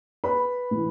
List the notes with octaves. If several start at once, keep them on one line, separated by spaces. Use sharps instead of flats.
B4 B5
A2 E3